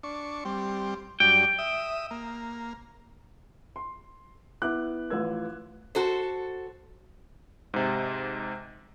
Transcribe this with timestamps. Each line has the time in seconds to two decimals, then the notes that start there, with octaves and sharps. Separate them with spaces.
0.03 D4 C#6
0.45 G3 C4
1.20 F#2 G3 D4 G5
1.58 E5 D#6
2.11 A#3
3.76 C6
4.62 B3 E4 D6 F#6
5.10 A1 F3 F4 B4 E6 G#6
5.95 F#4 A4 C5
7.74 G#2 C3